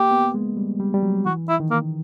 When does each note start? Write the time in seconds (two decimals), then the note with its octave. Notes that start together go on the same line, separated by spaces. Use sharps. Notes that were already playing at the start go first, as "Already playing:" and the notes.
Already playing: A#3 G4
0.11 B3
0.34 G#3
0.57 G3
0.80 G3
0.94 G3
1.03 F#3
1.26 E3 F#4
1.49 E4
1.60 D#3
1.71 A#3